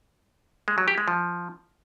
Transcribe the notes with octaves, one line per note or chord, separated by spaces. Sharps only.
G#3
F#3
G4
G#3
F3